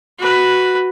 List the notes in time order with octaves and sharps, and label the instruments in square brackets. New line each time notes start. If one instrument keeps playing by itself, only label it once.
[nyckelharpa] F#4 B4